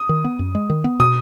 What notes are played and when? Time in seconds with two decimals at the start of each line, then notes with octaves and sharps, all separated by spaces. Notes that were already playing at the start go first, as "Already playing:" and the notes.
Already playing: D#6
0.09 D#3
0.24 B3
0.39 F#2
0.55 G#3
0.70 D#3
0.84 B3
1.00 B2 D#6